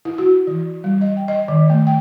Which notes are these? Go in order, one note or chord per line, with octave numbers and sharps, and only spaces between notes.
E4
F#4
E3
G3
D#5
G5
D#5
D#3
A3
G5